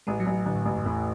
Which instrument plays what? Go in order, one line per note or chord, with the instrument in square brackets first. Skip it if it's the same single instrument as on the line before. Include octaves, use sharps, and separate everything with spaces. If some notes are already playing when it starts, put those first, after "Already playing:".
[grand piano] A1 [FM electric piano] G#3
[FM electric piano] F#3
[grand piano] A1
[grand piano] A1 [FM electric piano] D3
[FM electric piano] A2
[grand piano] A1 [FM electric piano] G#2
[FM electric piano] F#2
[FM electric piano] E2 [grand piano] A2